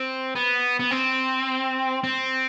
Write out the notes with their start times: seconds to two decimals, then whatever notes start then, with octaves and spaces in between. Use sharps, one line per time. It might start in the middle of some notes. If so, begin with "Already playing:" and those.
Already playing: C4
0.36 B3
0.80 B3
0.91 C4
2.04 C4